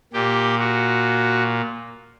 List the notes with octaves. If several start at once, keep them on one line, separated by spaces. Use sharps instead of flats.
A#2 G4
F#4